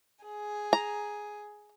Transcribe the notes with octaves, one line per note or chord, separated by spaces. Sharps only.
G#4
A#5